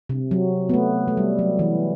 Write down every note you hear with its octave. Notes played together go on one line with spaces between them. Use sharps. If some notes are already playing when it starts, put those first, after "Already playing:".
C3
F#3
B3
A3
A3
G3
F#3
E3